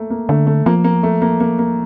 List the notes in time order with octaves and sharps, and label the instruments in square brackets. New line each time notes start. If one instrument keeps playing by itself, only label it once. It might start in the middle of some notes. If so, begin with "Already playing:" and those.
Already playing: [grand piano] A3 A#3
A#3
[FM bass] D3 [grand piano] A3
[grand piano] A3
[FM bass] F3 [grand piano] A#3
[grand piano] A#3
A3
A#3
A#3
A#3